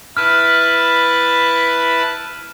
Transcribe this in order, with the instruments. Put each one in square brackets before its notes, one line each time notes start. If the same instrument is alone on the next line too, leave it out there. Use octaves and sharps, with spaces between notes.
[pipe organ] E4 B4 A5 [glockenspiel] F6